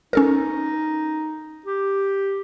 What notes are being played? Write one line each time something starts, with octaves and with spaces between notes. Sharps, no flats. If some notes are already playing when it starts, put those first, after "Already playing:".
C#4 D#4 A4 A#4
G4